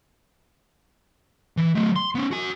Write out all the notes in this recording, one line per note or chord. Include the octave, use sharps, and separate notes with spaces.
E3
F#3 A3
C6
B3 C#4
F#4 G#5